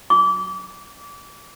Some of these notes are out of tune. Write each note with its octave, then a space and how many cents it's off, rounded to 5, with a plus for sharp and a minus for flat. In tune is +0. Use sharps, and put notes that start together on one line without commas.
D6 -30